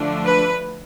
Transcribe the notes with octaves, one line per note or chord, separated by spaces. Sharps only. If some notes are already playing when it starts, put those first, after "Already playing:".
Already playing: D3 F3 A3 D4
B4